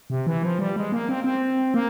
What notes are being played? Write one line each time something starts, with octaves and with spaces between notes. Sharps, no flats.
C3
E3
F3
G3
G#3
A#3
C4
C4
A#3